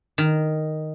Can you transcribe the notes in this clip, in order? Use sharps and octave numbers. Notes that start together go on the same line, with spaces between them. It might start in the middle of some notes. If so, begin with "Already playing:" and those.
D#3